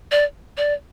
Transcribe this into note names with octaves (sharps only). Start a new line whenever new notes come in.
D5
D5